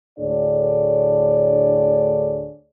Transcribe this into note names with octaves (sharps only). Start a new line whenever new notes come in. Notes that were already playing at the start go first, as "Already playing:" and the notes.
D2 A2 D4 G#4 C#5 D5